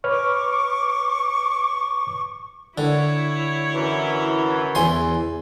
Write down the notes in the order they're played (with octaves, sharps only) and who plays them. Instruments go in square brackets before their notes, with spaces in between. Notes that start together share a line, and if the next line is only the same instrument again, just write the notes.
[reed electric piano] B4 C#5 F6 [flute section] C#6 D6
[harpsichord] D3 [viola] E4 C#5
[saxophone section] F#2 E3
[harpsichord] E2 G#5 C6